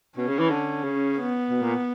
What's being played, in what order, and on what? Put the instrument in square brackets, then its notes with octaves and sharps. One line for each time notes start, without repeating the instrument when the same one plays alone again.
[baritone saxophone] B2 [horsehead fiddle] C#4
[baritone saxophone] C#3
E3
D3
C#3
[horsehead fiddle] B3
[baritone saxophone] B2
A#2